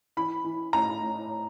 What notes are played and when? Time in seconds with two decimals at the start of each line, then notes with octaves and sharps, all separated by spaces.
0.17 E3 B5
0.44 E3
0.73 A2 A#5
1.02 A2